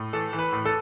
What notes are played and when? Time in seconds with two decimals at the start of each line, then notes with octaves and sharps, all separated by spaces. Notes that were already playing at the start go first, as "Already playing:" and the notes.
Already playing: A2
0.13 E3 A4
0.33 E3
0.39 B4
0.53 A2
0.65 A4